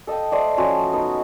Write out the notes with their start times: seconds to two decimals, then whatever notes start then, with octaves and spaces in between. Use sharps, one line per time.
0.07 A4 D#5 F5 G5
0.32 A3 C5 D5 D#5
0.57 F3 C#4 F#4 C6
0.93 B3 D#4